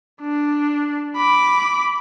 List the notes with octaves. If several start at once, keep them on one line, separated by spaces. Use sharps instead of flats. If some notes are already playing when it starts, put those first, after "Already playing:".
D4
B5 D6